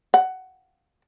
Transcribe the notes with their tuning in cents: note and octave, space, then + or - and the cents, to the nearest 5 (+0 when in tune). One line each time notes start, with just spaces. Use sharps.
F#5 +15